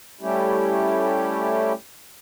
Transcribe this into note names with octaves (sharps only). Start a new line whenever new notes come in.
G3 A3 C#4 E4 G4